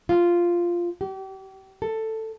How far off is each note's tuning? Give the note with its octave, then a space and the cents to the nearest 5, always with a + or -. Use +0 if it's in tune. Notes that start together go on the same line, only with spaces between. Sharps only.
F4 -5
G4 -35
A4 +10